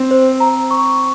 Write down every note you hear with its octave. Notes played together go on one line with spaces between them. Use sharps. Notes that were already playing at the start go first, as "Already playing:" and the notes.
Already playing: C4
C5
A#5
C#6